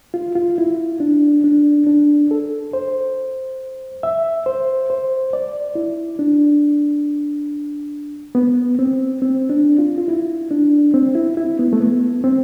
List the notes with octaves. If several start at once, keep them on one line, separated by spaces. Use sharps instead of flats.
F4
F4
E4
D4
D4
D4
A4
C5
E5
C5
C5
D5
E4
D4
B3
C4
C4
D4
F4
F4
E4
D4
C4
E4
E4
B3
A3
B3
C4